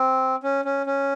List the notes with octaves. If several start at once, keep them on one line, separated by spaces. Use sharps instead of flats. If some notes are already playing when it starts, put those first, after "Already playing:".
Already playing: C4
C#4
C#4
C#4